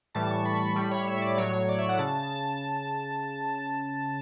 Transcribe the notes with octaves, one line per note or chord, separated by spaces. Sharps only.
A2 E3 G3 A5
C#6
B5
C#6
A2 G3 B5
C#5
E5
D5
A2 F#3 C#5
C#5
D5
E5
F#5
C#3 A5